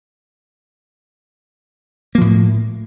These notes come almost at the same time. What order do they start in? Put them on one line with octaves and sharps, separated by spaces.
A#3 F3 A2